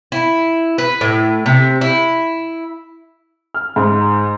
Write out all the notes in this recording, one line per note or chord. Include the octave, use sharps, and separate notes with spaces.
E4
B4
A2
C3
E4
F6
G#2